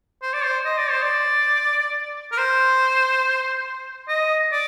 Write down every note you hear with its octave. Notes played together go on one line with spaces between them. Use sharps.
C5
D5
C5
D#5
D5
C5
D5
A#4
C5
D#5
D5